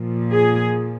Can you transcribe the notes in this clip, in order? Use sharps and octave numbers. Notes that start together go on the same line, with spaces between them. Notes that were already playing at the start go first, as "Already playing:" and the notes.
Already playing: A#2 F3
G#4